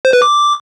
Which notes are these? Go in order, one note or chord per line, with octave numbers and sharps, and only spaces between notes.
C5
B4
D6